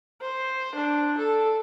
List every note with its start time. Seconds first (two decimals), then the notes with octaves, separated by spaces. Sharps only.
0.21 C5
0.75 D4
1.18 A4